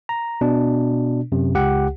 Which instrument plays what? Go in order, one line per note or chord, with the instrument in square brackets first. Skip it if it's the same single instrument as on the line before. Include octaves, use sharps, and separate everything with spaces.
[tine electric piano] A#5
B2 D4
F#2 C3
C#2 G4 F#5